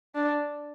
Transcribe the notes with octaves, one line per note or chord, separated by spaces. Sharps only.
D4